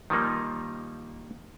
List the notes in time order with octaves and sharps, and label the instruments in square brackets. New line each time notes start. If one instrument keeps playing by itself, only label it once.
[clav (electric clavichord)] D#3 F3 G3 A#3 D#4